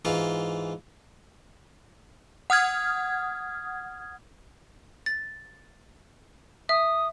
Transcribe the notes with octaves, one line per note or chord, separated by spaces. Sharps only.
G#2 E3 F4
F#5 D#6 F6 G#6
A6
E5 D#6